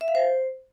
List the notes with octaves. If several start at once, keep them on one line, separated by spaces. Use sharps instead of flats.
E5
F5
C5